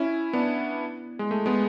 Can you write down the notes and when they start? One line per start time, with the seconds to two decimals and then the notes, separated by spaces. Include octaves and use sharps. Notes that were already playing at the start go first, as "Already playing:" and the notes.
Already playing: C#4 E4
0.33 B3 D4
1.19 G#3
1.31 A3
1.46 G#3 B3